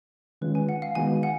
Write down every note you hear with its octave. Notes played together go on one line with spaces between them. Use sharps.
D#3 G#3 C#4 F4 B4
G#5
F#5
F5
D#3 G#3 B3 D#4 F#4 G#5
F#5